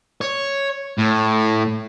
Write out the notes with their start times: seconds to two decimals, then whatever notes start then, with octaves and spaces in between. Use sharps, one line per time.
0.21 C#5
0.98 A2